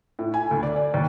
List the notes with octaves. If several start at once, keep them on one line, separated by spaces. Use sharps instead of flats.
A2
G#5
D2
D5
D5
D#2